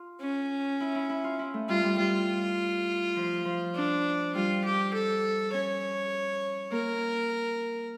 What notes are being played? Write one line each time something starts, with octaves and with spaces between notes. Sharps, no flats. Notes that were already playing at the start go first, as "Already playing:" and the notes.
Already playing: F4
C#4
E4
E4
E4
F4
E4
A3
G3 F4
G3
G3 F4
F3
F3
D4
G3 F4
G4
A4
C#4 C#5
A#3 A#4